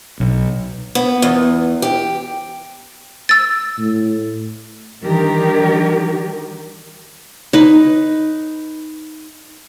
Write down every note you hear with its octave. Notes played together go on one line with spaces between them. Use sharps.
B1
B3
E2
G4
E6 A6
A2
D#3 E3 G3 D4 G4 A#4
D#4 B4